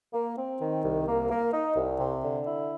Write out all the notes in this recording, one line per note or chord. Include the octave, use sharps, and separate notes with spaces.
A#3
C4
D#3
C2
A#3
A#3
D#4
C2
C3
D3
E4